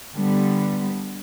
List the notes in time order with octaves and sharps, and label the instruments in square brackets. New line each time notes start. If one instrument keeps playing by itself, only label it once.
[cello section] D3 G3 B3